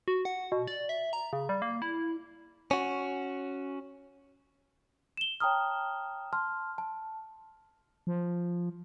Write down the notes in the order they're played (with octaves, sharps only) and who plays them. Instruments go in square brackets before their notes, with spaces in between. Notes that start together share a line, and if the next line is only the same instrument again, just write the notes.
[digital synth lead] F#4
F#5
B2
D5
E5
A#5
C#3
G3
A#3
E4
[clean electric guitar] C#4 F#4
[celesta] E7 G7
C#5 G5 A5 A#5 D#6 F6
A5 C6 F6
A5
[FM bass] F3